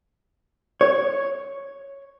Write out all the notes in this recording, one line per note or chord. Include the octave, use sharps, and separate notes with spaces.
C#5